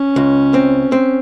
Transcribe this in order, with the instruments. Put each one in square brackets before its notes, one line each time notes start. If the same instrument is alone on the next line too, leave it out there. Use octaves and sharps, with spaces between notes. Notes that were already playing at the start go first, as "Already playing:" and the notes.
Already playing: [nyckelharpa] C#4
[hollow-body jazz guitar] C#2
C4
C4